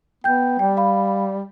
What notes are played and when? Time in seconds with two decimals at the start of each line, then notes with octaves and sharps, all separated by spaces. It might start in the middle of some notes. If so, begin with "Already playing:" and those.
0.24 B3 G5 G6
0.59 G3 G5
0.77 F5 B5